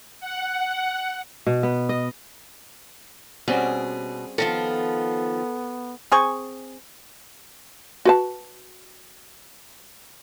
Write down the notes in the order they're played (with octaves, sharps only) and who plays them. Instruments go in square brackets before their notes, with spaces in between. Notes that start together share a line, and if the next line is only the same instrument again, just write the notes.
[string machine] F#5
[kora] B2
B3
D#5
[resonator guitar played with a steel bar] B2 [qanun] G3 C4 C#4 [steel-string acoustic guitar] G#4
[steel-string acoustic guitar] D#3 F3 F4 [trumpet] B3 [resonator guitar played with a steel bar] A4
[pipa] C4 G#4 C#6
[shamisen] F#4 B4 A5